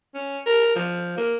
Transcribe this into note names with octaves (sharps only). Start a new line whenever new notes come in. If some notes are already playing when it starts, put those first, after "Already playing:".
C#4
A#4
F3
A#3